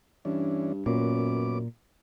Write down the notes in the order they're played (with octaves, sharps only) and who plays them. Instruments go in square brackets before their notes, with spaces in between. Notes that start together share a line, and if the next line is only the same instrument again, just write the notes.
[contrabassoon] G2 [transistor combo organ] E3 C#4 D4
[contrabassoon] F#2 [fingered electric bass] A#2 [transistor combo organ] B3 C#4 D6